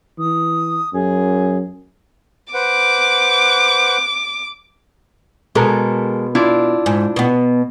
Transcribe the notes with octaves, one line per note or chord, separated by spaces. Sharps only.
E3 D#6
F#2 G#4
B4 C5 F#5 D6
B2 G#3 A4 A#4
D4 E4 F4
G#2
B2 B3